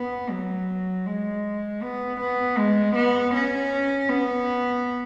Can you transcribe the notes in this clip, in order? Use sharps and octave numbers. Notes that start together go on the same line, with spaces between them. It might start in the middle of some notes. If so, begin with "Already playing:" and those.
Already playing: B3
F#3
G#3
B3
B3
G#3
B3
C#4
B3